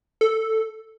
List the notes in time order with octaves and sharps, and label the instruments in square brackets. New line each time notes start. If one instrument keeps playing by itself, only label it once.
[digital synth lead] A4